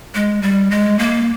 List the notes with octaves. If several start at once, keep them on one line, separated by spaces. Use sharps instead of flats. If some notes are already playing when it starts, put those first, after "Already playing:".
G#3
G3
G#3
A#3